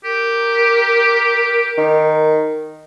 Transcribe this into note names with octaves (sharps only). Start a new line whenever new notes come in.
G4 A#4
D#3